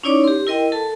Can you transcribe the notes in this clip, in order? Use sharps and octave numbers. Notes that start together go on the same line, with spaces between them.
C#4 D#4 E4 C#5 D5 D6
G4 C6
E4 A#4 D#5 G5
A4 A5